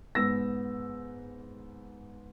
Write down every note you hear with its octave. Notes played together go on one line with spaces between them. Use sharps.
G#2 B3 E6 A#6